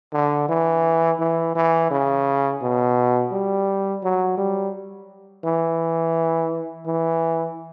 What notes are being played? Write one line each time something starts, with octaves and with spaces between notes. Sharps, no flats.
D3
E3
E3
E3
C#3
B2
G3
F#3
G3
E3
E3